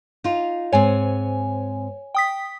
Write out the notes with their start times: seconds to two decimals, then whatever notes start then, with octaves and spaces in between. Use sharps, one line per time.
0.24 D#4 F4
0.72 G#2 C4 C#5 G#5
2.15 G5 D#6 B6